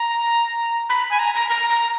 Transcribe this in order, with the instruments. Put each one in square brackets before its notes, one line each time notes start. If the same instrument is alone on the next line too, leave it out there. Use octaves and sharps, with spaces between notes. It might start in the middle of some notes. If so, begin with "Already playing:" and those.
Already playing: [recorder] A#5
B5
G#5
A#5
A#5
A#5
A#5